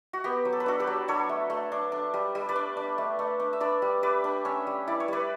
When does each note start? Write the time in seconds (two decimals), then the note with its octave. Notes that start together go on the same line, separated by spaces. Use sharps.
0.13 F#4
0.24 B3 G4
0.45 F#3
0.53 A4
0.60 B4
0.66 D4 F#4 A4
0.80 G4 B4
0.87 F#3
1.08 D4 A4 C#5
1.29 A3
1.50 A3
1.72 D4
1.92 D4
2.14 G3
2.35 G3
2.49 B4 D5
2.56 D4
2.77 D4
2.98 A3
3.19 A3
3.40 D4
3.53 E5
3.60 D4 B4 D5
3.82 G3
4.03 G3 B4 D5
4.24 D4
4.45 C#4 C#5 E5
4.67 G3
4.88 E4 D5
5.00 C#5
5.08 G3 B4 D5